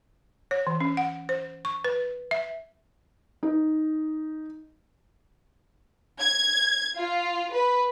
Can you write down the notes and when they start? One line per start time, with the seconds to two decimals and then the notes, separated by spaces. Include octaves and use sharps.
0.51 C#5
0.67 E3
0.80 C#4
0.97 F#5
1.29 C5
1.65 C#6
1.85 B4
2.31 E5
3.43 D#4
6.21 G#6
6.96 F4
7.54 B4